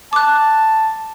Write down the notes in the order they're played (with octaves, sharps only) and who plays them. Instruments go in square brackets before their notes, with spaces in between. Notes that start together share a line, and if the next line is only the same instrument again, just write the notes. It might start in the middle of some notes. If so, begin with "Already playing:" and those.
[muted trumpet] A5 [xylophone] D6 F#6